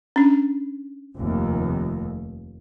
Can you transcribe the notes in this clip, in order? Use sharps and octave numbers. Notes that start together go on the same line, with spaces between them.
C#4 D4
F1 D#2